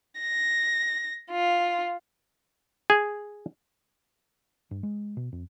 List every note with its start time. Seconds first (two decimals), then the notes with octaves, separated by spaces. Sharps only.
0.20 A#6
1.31 F4
2.90 G#4
4.71 G2
4.83 G#3
5.17 B2
5.32 F2